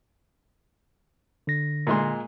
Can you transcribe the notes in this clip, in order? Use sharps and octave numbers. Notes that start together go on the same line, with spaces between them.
D3 A#6
A#2 G#3 C6